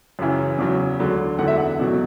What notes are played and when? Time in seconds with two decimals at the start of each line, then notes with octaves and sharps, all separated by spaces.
0.19 F#2 C#3 E3
0.58 E2 C#3 F#3
0.99 D2 D3 F#3
1.39 E2 D3 F#3 F#5
1.48 E5
1.58 F#5
1.79 E2 B2 F#3